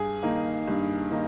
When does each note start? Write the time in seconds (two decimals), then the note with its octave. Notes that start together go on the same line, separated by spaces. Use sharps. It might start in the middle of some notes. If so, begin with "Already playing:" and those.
Already playing: G2 G#4 G#5
0.23 D#3 A#3 D#4
0.67 G2
1.11 D#3 A#3 D#4